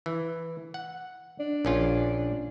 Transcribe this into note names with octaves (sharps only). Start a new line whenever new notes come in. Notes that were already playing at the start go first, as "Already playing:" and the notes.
E3
F#5
D4
A#1 C#4 F4